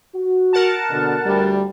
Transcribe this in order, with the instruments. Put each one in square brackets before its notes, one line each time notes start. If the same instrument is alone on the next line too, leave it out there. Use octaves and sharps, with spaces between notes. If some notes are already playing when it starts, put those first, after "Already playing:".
[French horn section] F#4
[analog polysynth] A#4 F#5 A5
[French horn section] B2 D3
D2 G3